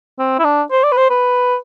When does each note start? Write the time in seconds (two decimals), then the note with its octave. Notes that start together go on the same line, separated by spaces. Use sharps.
0.19 C4
0.39 E4
0.44 D4
0.71 C5
0.84 D5
0.92 B4
0.97 C5
1.10 B4